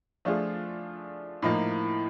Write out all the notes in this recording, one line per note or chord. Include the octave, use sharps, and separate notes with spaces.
F3 A3 D4 F4 G#4
A2 F3 A#3 D#4